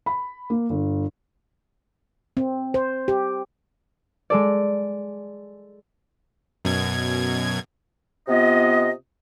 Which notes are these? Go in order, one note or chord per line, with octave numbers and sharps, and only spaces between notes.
B5
A#3
G1
C4
C5
G4
G#3 A4 D5
F#2 B2 G#6
C3 B3 F4 D#5